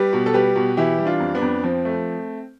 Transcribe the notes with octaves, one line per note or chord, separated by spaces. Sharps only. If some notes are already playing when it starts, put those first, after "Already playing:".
Already playing: G3 G4 B4
B2
A4
G3 G4 B4
B2
E3 E4 G4
G3
D4 F4
F2
B3 D4
F2
F3 C4
A3